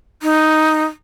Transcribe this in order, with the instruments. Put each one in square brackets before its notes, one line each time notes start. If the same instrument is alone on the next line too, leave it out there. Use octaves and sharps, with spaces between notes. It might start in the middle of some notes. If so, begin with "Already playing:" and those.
[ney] D#4